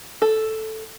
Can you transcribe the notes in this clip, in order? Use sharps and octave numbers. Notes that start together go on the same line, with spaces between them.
A4